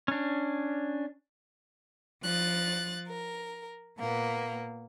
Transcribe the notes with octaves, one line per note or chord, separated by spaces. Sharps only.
C#4 D4
F3 F#6 A6
A#4
A#2 A#3 B3